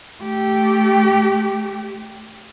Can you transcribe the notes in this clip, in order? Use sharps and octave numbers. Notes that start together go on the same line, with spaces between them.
A3 G4